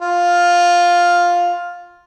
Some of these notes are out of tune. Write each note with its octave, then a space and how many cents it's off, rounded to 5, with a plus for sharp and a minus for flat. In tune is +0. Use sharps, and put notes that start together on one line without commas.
F4 +5